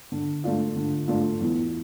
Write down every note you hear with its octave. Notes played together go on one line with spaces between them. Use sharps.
D3
A3 D4 F4
D3
A3 D4 F4
E2